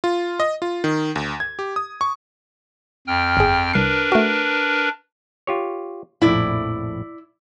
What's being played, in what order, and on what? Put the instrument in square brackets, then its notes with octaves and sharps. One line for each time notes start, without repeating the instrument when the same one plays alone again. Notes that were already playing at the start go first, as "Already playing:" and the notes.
[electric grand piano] F4
D#5
F4
D#3
D2
G#6
G4
D#6
C#6
[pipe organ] F2 G5 F6
[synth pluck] G1 G#4
[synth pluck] C2 C7 [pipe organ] D4 A#4 B4
[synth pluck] A3 F#4
[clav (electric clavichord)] F4 G4 C#5
[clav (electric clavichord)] A#1 F2 A2 [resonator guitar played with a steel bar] E4 D5